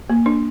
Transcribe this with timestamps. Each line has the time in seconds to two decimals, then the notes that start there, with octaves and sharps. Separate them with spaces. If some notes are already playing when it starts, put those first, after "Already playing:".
0.10 A#3
0.26 D4